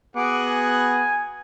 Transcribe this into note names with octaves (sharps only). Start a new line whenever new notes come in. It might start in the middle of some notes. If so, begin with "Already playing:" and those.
B3 F#4 G#4 F#5 D6
G#5